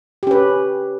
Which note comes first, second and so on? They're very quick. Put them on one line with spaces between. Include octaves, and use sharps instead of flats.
G4 C#4 B4